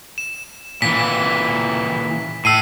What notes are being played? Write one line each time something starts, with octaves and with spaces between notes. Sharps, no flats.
E7
A#2 E3 B6
A2 E6 C7 D#7